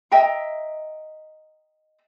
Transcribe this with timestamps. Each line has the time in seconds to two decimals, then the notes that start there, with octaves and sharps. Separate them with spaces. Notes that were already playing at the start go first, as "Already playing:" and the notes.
0.12 D#5 E5 G5 A#5